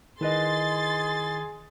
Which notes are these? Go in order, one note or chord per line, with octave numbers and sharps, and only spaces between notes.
D#3 E4 G#4 B4 D#5 C6 A6